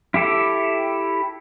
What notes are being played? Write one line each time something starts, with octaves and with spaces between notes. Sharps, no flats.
E4 G4 A4